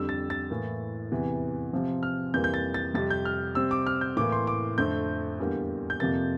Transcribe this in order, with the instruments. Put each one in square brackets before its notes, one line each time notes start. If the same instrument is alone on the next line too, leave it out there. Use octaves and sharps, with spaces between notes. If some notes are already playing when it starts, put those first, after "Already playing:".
Already playing: [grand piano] F2 D3 G3 E6
A6
A6
A2 E3 A#3
E2 C3 E3
C3 F3 C4
F6
F2 E3 G3 A#3 G6
G6
A6
A6
F2 C3 G3 A6
G6
F6
C3 G3 C4 E6
D6
F6
G6
A2 E3 A#3 D6
C6
D6
F2 D3 A3 C4 G6
E2 D3 G3 A#3
G6
F2 C3 F3 A#3 A6